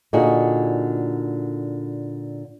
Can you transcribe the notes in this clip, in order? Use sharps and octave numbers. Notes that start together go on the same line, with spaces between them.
A#2 D3 D#4 F#4 G#4